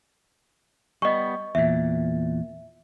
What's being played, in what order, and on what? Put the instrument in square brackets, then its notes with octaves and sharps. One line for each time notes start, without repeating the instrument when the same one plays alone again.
[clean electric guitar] G3 B3 [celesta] D#5 C#6
[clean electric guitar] E2 A#2 [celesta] E5